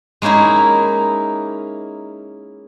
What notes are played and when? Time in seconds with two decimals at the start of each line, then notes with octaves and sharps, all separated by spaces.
0.22 G#3 A#3 C#4 D#4 E4